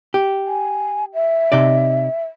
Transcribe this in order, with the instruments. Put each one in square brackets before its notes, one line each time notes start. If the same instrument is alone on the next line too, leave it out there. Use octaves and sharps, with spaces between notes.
[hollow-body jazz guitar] G4
[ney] G#5
E5
[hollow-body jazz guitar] C3 D#4 D5